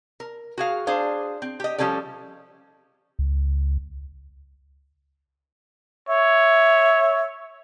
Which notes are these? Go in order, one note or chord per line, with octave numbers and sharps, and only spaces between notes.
A#4
F#4 G#4 F5
D4 G#4 C5 F5
C4
G4 D#5
F3 G3 C#4 A4 D5
C#2
C#5 E5